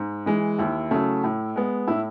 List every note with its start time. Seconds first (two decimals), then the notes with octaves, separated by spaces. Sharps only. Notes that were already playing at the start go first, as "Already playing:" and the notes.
Already playing: G#2
0.26 E3 G#3
0.58 D#2 E4
0.91 C#3 F#3 A3
1.24 A2
1.56 G#3 B3
1.87 A2 E4